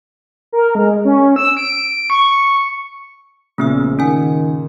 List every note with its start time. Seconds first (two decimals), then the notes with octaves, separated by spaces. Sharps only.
0.53 A#4
0.75 G#3
1.05 C#4
1.36 E6
1.57 D7
2.10 C#6
3.58 A#1 A#2 C#3 A3 B3 E6
3.99 D#3 C#4 G#5